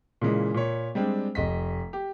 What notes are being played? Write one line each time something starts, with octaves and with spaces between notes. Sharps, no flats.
A#2 C#3 E3 G#3
A#2 C#5
G3 G#3 C4 D4
F1 D#5 B6
G4